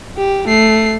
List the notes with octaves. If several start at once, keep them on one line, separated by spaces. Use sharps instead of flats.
G4
A3 C7